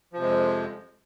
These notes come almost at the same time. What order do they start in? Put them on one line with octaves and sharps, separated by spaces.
F3 C3 G#3 F2